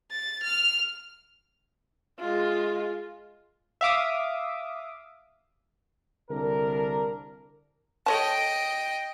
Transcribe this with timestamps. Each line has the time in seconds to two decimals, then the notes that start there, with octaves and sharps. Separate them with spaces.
0.11 A6
0.43 F6
2.20 G#3 F4
3.81 E5 F5 D6 D#6
6.30 C2 D3 D4 A#4
8.06 A4 C#5 D#5 G5 A5